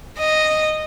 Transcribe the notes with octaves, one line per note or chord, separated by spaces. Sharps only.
D#5